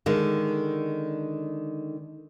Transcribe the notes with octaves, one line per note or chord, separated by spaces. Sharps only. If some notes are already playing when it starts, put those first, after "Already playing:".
D3 D#3 G#3